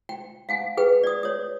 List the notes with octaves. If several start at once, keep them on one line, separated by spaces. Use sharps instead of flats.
G5
F5 F#5 G#5
G#4 B4 G5
D5 D#6
C#5 D#6